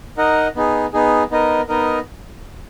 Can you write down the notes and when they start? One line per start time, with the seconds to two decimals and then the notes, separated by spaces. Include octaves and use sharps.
0.17 D#4 A#4 D#5 F#5
0.56 B3 D#4 G#4
0.93 B3 D#4 G#4
1.31 B3 D#4 A#4 D#5
1.68 B3 D#4 A#4 D#5